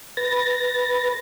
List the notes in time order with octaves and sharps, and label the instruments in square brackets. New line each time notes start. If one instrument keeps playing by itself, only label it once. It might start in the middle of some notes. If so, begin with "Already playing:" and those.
[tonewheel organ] B4 A6 A#6